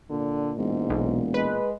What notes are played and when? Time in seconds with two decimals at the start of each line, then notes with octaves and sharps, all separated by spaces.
0.10 A#2 D3
0.58 E1 G#2
0.90 B1
1.34 G#3 B4